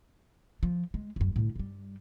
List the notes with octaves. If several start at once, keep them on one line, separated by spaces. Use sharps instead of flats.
F3
G#3
D1 F#2
A2 D3
G2 G3